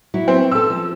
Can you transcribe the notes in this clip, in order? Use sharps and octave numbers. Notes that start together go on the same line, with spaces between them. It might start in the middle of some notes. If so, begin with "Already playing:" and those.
F#3 E4
C4
C#4 A4 E6
F3